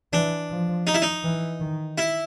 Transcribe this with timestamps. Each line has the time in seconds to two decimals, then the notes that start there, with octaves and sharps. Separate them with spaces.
0.13 E3 D4
0.50 F3
0.87 D#4
0.94 E4
1.02 D#4
1.23 E3
1.60 D#3
1.98 E4